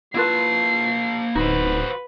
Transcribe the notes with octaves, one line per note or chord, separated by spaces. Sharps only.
A#3 E4 F4 B4 A5 C7
D1 D#4 F#4 B4 C5